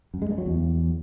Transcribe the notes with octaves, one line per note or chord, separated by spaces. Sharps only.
F#2
G#3
G2
F#3
E2